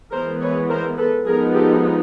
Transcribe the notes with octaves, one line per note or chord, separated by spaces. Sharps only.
E3 G#3 B3 A#4 C5
B4 C#5
A#4 C5
A4 B4
F3 G#3 B3 D#4 G#4 A#4
G4 A4